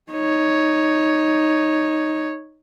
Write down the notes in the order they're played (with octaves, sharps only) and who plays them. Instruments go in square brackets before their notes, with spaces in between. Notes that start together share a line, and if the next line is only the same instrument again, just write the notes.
[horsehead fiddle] D#4 C#5